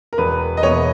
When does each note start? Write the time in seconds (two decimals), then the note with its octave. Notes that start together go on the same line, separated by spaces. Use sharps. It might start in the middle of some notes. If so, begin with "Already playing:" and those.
0.13 A#4
0.18 E1 B4
0.57 D#5
0.63 E2 B2 A#3 C#5